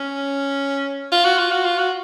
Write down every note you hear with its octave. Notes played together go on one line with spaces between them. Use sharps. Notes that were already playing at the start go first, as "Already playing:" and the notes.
Already playing: C#4
F4
F#4
F4
F#4
F4
F#4